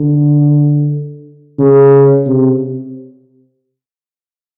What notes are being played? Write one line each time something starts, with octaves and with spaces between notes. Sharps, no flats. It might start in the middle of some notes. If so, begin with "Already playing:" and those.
Already playing: D3
C#3
C3